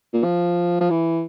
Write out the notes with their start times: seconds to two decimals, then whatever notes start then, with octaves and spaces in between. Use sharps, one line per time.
0.13 A#2
0.24 F3
0.80 F3
0.90 E3